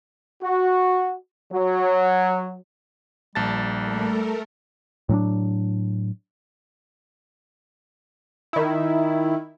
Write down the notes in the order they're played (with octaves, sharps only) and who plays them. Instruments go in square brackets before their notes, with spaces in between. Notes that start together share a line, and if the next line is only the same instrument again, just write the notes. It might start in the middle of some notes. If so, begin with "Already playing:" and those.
[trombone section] F#4
F#3
[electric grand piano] A#1 A5 A6 [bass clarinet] G3
[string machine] A3 A4 A#4
[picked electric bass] A2 F#3 C4 D4
[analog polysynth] D#3 E4